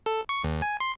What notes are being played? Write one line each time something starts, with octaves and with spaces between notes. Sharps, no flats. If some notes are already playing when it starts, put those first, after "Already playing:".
A4
C#6
D#2
G#5
C6